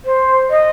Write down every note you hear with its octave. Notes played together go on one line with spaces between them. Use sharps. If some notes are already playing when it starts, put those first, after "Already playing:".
C5
D#5